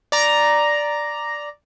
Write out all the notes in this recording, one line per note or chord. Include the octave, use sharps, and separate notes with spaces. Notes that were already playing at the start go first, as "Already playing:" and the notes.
D5 A#5